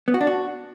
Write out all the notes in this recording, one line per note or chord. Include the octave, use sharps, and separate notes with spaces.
B3
F#4
D4
F#4